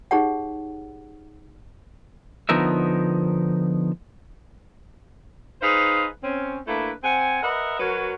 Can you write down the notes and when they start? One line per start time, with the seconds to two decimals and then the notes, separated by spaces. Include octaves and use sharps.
0.11 D#4 G4 G#4 C#5 F#5
2.49 D3 F3 B3 D#4 A#4 E5
5.62 D#4 G#4 B4 C5 F5
6.23 C4 C#4
6.67 A3 A#3 D4 E4 B4
7.04 C4 F#5 G#5
7.43 A#4 B4 D#5 E5 F#5
7.79 F#3 F#4 A#4 B4 C#5